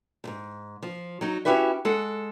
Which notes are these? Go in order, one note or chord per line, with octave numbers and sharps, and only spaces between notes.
D2 G#2
F3
F#3 D#4
C#4 E4 F#4 G4 B4 E5
G#3 A4 F#5